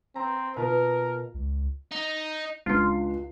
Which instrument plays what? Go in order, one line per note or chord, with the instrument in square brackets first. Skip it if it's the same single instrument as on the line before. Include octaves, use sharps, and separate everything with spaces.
[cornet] C4 [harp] A#5
[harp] B2 F4 [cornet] A#4
[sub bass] C#2
[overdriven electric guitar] D#4
[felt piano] C#2 D4 C7 [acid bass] F4